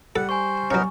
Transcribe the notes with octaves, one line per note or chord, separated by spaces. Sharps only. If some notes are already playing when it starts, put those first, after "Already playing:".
G3 A4 F#5
C5 G#5 C#6
F#3 B3 C#4 D#4 A#4